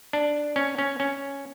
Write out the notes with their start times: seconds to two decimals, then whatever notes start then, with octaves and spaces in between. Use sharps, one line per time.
0.13 D4
0.56 C#4
0.78 C#4
1.00 C#4